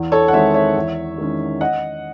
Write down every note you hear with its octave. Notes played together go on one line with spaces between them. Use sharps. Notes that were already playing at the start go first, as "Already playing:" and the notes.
Already playing: E2
A4 C#5
F#5
D#3 G#3 C4 C#5 E5
C#5 E5
E2
D#3 G#3 C#4
D#5 F#5